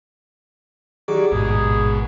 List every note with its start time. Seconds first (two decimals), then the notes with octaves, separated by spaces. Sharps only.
1.08 D#3 F#3 G4 G#4 D5
1.31 A1 D#2 G#2 B2 G#4